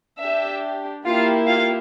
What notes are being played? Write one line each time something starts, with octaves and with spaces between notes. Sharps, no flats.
D4 G4 E5
A#3 E4 F4 G4 F5
F4 F5